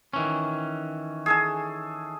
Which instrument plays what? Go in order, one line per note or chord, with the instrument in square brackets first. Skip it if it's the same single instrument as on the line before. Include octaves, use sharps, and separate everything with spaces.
[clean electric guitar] D#3 E3 C#4
[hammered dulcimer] G#4 A4 G#5